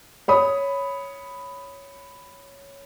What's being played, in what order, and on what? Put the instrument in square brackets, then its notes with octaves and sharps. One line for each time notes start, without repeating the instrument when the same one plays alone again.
[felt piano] C#5 B5 D#6